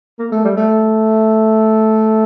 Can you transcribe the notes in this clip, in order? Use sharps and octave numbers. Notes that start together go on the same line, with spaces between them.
A#3
A3
G3
A3